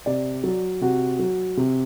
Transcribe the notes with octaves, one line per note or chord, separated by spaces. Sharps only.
C3 D5
F#3
C3 F#4
F#3
C3